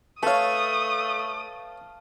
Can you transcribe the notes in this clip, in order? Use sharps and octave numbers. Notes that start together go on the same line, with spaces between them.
A3 B4 C#5 F5 A5 D#6